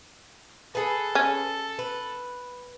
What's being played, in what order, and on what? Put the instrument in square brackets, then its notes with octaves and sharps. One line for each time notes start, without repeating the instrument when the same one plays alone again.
[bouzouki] G#4 B4 [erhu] A4
[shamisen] C#4
[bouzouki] B4